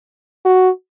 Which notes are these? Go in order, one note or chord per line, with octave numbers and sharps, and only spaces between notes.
F#4